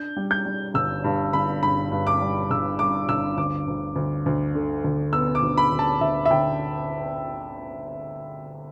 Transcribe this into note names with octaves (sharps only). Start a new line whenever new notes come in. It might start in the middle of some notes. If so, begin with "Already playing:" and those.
Already playing: D4 G6
G3
G6
G3
G1 E6
G2
G1 B5
G2 B5
G2
D6
G3
G1 E6
G3 D6
G1 E6
D2 D6
D2
D2
D2
D3
D2
B3 E6
D6
D2
B5
D2
A5
D2 E5
E5
D2 G5